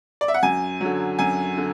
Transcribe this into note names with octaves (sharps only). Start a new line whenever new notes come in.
D5
E5
F#5
F#2 G#5
D3 F#3
F#2 G#5
D3